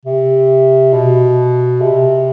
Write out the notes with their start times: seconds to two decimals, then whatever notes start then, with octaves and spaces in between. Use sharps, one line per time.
0.05 C3
0.93 B2
1.81 C3